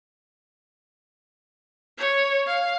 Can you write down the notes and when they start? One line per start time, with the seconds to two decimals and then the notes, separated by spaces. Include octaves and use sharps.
1.98 C#5
2.47 F5